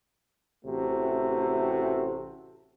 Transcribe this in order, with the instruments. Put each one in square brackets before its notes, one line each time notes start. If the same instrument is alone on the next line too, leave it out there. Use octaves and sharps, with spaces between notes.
[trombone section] A1 C3 A3 F#4